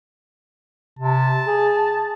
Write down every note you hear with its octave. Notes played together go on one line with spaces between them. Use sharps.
C3 A5
G#4